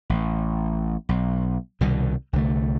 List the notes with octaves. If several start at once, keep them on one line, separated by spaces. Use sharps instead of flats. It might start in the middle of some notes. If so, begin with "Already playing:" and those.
A1
B1
C2 B2 D#3 G3
C2 D3 F3 A3